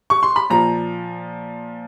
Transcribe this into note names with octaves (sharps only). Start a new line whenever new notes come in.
C#6
C6
B5
A#2 F3 A#5